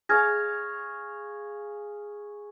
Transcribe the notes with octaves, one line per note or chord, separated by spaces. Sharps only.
G#4 C#5 F5 F6 G#6 A#6